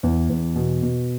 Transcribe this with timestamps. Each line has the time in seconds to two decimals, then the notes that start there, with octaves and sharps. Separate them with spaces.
0.03 E2
0.29 E2
0.55 B2
0.83 B2